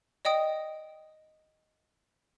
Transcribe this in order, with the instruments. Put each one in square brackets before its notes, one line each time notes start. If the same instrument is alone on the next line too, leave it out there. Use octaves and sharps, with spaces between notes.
[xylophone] D5 D#5 G5 D#6